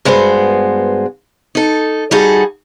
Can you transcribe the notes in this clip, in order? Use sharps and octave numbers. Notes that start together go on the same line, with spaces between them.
G2 G#3 B3 F#4 C5
D#4 A4
G3 D#4 F#4 G#4 A4